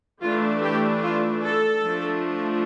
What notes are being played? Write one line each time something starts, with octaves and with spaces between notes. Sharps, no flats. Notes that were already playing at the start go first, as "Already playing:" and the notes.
E3 A3 D4 F4
G4
F4
A4
F3 A3 D4